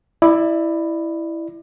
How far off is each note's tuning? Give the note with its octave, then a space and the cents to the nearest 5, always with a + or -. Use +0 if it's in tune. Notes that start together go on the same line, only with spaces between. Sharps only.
E4 +0 D5 +30